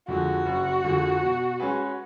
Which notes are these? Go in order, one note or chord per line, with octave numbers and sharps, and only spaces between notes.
F2 D3 F3 G#3 F#4
F#1
F2 D3 F3 G#3
B2
G#3 C#4 G#4 B4